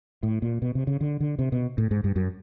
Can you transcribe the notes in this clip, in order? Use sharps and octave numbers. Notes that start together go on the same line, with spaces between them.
A2
A#2
B2
C3
C#3
D3
D3
C3
B2
A2
G#2
G2
F#2